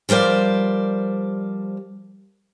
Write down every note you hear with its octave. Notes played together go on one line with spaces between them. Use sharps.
F3 G3 A#4 C5 D5